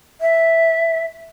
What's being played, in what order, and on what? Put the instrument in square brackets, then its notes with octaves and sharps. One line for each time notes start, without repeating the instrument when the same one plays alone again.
[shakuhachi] E5